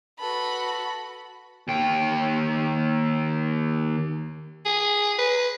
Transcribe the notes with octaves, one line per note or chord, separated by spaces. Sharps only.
F#4 A4 B4 B5
D#2 G5
G#4
B4